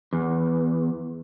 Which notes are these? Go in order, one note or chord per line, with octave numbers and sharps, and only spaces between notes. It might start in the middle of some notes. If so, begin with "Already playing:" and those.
E2